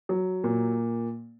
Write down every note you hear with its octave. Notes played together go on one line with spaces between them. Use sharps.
F#3
A#2